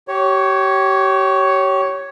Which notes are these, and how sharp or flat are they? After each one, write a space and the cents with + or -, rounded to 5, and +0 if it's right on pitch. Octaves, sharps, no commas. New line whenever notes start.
G4 -30 C#5 +0